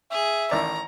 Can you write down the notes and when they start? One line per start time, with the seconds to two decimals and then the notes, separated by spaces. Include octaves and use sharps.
0.11 G#4 E5
0.51 A1 D#3 D5 A#5